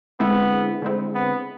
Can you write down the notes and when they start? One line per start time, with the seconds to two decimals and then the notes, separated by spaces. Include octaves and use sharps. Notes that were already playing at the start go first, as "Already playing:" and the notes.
0.20 D3 G#3 B3 C4 E4
0.82 D3 G#3 C4 E4
1.15 B3